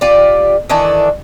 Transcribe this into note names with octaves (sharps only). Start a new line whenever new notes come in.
F4 G4 D5
D#3 E3 D4 A4